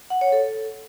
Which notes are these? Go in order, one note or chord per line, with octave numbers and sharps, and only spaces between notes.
F#5
C#5
A4